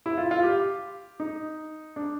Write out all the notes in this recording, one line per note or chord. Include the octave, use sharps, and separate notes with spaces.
E4
F4
F4
G4
D#4
D4